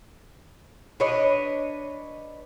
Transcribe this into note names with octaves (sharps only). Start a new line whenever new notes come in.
D4 B4 C#5 D#5